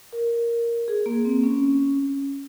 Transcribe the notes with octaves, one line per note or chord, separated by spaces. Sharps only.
A#4
G#4
A#3
C4
C#4